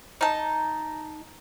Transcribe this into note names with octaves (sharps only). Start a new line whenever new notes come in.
D#4 A5